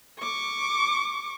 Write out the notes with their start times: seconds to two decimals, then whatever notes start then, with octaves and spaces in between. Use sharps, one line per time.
0.19 C#6 D6